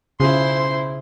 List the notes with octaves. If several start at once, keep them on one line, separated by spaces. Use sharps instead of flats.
B1 C#3 E4 F4 G#4 C5 C6